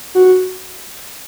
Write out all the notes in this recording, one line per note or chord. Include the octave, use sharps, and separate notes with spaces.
F#4